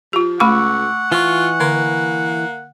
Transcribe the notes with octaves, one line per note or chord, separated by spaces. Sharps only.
F3 F4 G4
C#2 A3 F#5 B5 C#6 D6 E6
E3 F4 C#6
D3 A#3